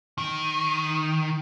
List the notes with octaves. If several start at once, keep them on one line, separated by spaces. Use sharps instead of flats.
D#3